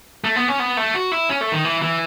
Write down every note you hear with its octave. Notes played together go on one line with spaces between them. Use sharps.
A3
B3
C#4
B3
A3
F#4
E4
C#4
A3
D#3
E3
E3